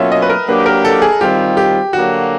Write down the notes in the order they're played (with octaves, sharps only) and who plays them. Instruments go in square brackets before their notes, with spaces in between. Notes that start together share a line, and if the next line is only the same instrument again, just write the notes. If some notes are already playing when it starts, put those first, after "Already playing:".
Already playing: [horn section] B2 F#3 A#3 C#4 F4 [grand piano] E5
[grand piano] D#5
B4
A#4
[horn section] F#3 A#3 D4 G4 [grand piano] B4
[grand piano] A#4
A4
G#4
[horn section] D#3 G3 C4 F4 [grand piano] G4
[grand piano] G4
[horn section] D3 F#3 A#3 [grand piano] F#4